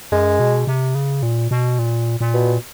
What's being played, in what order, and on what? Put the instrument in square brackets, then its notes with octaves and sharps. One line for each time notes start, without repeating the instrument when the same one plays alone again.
[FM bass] F#2 [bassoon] G#3
[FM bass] B2
C3
C#3
A#2
B2
A#2
A#2
[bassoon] B2